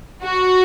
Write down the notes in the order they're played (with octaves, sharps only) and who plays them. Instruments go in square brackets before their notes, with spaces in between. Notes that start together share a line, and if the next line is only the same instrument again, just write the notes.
[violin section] F#4